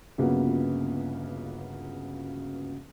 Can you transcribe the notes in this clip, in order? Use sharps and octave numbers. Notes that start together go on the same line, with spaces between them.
G1 C#2 C#3 F#3 A#3 B3